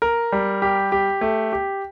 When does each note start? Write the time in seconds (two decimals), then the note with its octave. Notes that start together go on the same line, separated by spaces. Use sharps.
0.02 A#4
0.32 G3
0.62 G4
0.92 G4
1.21 A3
1.53 G4